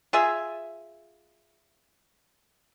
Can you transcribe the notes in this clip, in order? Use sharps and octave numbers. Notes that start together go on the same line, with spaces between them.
F4 G#4 E5